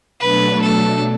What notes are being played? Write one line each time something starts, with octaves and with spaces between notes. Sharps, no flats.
B2 F#3 A3 D4 B4
A4